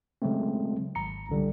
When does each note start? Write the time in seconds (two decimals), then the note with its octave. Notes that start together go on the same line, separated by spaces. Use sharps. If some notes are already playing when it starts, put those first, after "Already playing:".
0.22 C#3 F#3 G#3 A3 C4
0.95 G#1 A#5 C#7
1.29 C2 D3 G3